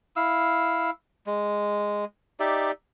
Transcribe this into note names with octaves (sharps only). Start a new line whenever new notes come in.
E4 F5 E6
G#3
D#4 G4 D5 E5